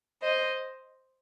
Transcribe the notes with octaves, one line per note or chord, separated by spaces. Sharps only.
C5 D#5